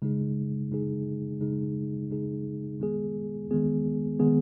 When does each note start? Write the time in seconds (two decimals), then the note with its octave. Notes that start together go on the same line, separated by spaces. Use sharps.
0.02 C#3 G#3 D#4 G#4
0.72 C#3 G#3 D#4 G#4
1.41 C#3 G#3 D#4 G#4
2.11 C#3 G#3 D#4 G#4
2.80 D#3 G#3 B3 G#4
3.51 D#3 G#3 B3 G#4
4.20 D#3 G#3 B3 G#4